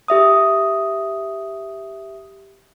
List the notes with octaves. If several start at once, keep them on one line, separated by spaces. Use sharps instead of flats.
G4 E5 D#6